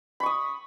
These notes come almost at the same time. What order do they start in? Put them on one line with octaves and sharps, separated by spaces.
B5 C#6 D#6